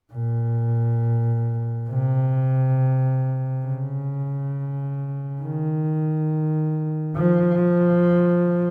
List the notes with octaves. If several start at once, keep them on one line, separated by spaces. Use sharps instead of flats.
A#2
C3
C#3
D#3
F3